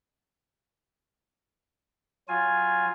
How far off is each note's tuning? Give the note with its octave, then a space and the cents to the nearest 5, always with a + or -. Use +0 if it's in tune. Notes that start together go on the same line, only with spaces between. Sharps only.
F#3 +0 F4 +0 G#5 +0